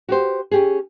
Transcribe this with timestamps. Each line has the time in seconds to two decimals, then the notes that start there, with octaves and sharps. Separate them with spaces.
0.08 F#4 G4 C5
0.51 C#4 G4 G#4